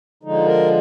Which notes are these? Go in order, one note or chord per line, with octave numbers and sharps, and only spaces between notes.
D3 F3 G#3 D#4
A#4